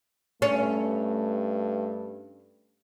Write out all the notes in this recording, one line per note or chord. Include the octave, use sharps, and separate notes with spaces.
G2 A3 C#4